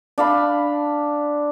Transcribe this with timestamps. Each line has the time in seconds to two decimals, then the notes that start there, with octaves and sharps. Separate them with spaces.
0.18 D4 F5 B5